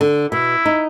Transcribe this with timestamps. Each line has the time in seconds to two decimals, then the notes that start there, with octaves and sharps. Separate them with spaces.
0.01 D3
0.32 B2 E4
0.66 D#4